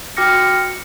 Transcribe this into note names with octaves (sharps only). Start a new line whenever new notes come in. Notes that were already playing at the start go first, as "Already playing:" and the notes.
F#4 G5 D6 F6 A#6 C#7